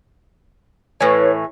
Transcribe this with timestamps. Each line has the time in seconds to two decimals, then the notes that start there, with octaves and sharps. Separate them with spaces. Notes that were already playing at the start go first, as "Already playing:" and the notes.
1.01 A2 E3 B4 C#5